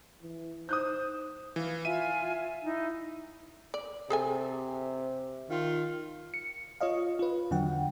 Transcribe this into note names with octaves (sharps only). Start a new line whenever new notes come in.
E3
D#4 C5 D#6 F#6 G6
E3 F5
F4 E5 G#5 D#7
D#4 E4
D5
C3 G#4 A4 G#5
D#3 F4
C#7
F4 C#5 D#5 F5
F4 B4
E2 D3 F#3 F#5 G5